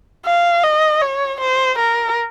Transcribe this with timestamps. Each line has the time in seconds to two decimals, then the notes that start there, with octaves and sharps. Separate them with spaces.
0.26 F5
0.64 D#5
1.01 C#5
1.40 C5
1.78 A#4